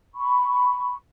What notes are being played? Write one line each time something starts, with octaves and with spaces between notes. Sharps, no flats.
B5 C#6